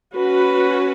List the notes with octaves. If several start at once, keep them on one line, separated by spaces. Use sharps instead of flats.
C#4 F#4 B4